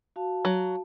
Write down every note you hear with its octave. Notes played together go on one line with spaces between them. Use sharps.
F#4 F5 A5
F#3